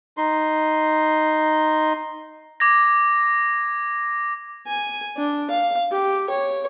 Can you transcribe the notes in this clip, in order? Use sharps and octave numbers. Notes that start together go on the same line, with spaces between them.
D#4 C6
D6 G#6 A#6
G#5
D4
F5
G4
C#5